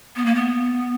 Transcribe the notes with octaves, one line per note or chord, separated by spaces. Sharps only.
B3
A#3
B3